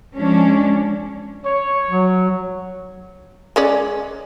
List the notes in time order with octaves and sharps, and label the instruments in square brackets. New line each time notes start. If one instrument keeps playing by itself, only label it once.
[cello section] F3 G#3 C#4 D4
[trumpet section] C#5
[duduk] F#3
[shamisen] G#3 C#4 D5